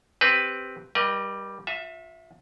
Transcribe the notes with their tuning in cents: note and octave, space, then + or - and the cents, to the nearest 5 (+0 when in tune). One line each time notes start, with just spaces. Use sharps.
C4 +0 G4 +0 B4 +5
G3 +0 A#4 +45 D#5 -20
F4 +45 E5 +0